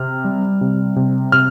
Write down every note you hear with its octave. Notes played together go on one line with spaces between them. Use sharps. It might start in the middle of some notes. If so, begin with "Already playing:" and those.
Already playing: C3 F6
G3
C3
C3
C3 F6